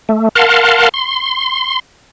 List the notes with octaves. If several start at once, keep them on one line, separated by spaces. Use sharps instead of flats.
A3
A#4 F5 F#5 A5 C6
C6